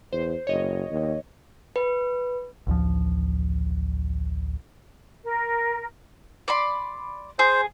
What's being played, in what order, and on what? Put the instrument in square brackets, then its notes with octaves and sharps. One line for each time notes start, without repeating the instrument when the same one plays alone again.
[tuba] E2 [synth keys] C5
[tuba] F#1 [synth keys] C#5 D#5
[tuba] D#2
[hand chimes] B4
[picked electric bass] A1 D2 F3
[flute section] A#4
[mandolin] D5 B5 C6
[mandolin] G#4 [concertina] C5